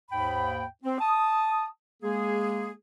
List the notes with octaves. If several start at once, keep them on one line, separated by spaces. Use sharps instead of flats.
D#2 G#2 G5 B5
C4
A5 D#6
G#3 A#3 G#4